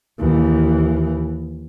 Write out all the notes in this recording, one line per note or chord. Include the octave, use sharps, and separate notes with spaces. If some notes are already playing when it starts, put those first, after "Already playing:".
D#2 E3